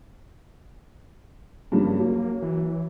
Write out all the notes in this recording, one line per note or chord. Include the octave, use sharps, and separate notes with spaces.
G2 C#3 F3 A#3
F#3
E3